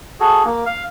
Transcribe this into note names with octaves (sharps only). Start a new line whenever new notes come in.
F#4 G#4 A4
A#3
F5